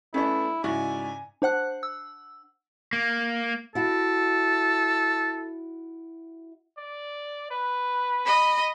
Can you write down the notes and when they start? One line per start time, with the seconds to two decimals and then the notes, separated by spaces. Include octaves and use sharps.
0.14 A3 B3 C#4 D4 E4
0.64 G#2 C#3 E4 F#4 D5 G#5
1.42 D4 C5 F#5 F#6
1.83 E6
2.93 A#3
3.75 E4 F#4 A4
6.78 D5
7.51 B4
8.26 D#5 B5